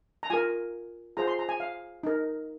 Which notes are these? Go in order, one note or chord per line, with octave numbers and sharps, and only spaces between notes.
A#5
F4 A#4 G#5
F4 G#4 C5 A#5
C6
A#5
G#5
F5
D#4 A#4